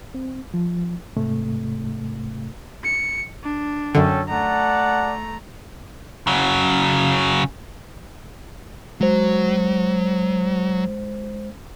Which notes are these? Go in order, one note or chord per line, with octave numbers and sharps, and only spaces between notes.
C4
F3
G#2 C3 A3
C#7
D4
F#2 D3 C#4 A4 G5
A3 D5 F#5 A5 A#5
C#3 F#3
F#3 G#3 C5